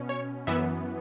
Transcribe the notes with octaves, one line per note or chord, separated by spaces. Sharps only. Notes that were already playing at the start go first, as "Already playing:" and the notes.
Already playing: B2 C#4
C#5
F#2 E3 B3 E5